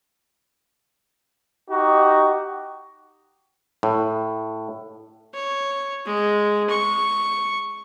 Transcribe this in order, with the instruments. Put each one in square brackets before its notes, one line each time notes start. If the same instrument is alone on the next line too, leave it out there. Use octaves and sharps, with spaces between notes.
[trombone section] D#4 F#4 G4
[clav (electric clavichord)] A2
[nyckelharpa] C#5
G#3
C#6